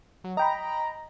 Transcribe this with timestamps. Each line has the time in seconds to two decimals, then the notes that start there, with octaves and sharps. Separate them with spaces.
0.24 F#3
0.37 D#5 G5 A#5 B5